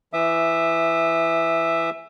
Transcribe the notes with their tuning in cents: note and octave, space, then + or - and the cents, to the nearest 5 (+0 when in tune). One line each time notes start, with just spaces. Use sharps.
E3 +15 E5 +0 D#6 -40